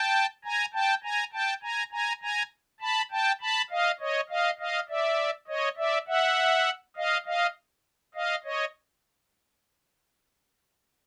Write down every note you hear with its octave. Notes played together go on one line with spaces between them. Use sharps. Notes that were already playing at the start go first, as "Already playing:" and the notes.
Already playing: G5 A5
G#5 A#5
G5 A5
G#5 A#5
G5 A5
G#5 A#5
G#5 A#5
G#5 A#5
A5 B5
G5 A5
A5 B5
D#5 F5
C#5 D#5
D#5 F5
D#5 F5
D5 E5
C#5 D#5
D5 E5
E5 F#5
D#5 F5
D#5 F5
D#5 F5
C#5 D#5